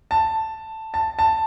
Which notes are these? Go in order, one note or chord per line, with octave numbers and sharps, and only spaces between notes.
A5
A5
A5